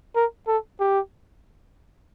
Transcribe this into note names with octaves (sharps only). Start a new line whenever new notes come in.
A#4
A4
G4